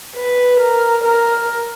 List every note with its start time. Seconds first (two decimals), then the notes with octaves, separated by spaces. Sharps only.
0.16 B4
0.60 A#4
1.04 A#4